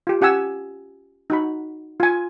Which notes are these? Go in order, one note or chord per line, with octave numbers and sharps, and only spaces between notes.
F4 G4
C#4 G4 F#5 G#5 E6
D#4 F#4 B5
F4 G#5